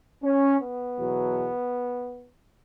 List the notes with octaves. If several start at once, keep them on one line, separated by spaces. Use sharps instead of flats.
C#4
B3
E2 B2 F#3